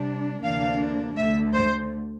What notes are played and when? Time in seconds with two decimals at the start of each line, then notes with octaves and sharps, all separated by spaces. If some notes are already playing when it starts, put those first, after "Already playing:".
Already playing: C3 G3 D4
0.42 D2 C3 E3 A#3 D4 F5
1.16 D2 D3 A3 E5
1.53 C5